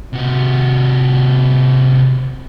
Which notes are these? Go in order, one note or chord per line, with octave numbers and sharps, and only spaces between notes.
C3 F#4